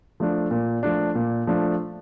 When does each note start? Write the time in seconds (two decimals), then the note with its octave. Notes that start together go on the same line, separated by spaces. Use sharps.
0.20 F3 A3 D4
0.51 A#2
0.83 F3 A3 D4
1.15 A#2
1.47 F3 A3 D4